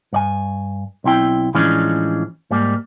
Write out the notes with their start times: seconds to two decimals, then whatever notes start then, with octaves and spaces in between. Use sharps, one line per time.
0.13 G2 D5 G#5
1.04 B1 C4 E4 G5
1.54 A2 E3 F3 G#3 C#4 D4
2.51 G#2 G3 A#3